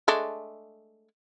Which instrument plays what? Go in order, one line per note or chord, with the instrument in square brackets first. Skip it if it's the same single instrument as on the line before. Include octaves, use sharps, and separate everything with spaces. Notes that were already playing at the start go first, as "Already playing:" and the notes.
[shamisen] G#3 A3 D4